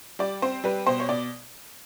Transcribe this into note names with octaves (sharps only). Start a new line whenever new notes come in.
G3 D5
C4 C5
G3 B4
B2 C5
C#5
B2 D5